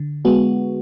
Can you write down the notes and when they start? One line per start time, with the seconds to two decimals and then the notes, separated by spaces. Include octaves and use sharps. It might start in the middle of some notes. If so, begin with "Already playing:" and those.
Already playing: D3
0.25 G#3 B3 F#4